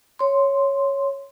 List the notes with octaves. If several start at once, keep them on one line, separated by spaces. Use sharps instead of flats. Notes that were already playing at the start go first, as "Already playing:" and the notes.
C#5 C6